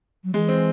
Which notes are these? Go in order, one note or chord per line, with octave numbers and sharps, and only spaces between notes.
F#3
E3 G#3
C4